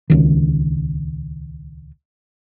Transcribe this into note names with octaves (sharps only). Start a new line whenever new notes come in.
D#1 C#2 D#3